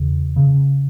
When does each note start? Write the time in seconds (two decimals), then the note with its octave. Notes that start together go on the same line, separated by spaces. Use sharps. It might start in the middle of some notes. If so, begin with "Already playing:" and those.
Already playing: E2 C#3
0.36 C#3